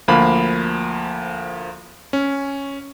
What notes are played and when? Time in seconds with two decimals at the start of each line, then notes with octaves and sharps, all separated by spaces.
0.08 D2 F3 A#3 F5 B5
2.13 C#4